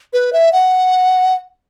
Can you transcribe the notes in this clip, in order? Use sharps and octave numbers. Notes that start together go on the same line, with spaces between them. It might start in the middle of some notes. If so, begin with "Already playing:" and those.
B4
E5
F#5